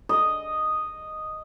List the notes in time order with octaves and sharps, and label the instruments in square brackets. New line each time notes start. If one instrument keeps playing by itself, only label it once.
[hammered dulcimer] D#5